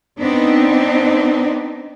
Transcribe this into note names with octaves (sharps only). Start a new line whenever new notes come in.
B3 C4 D4 D#4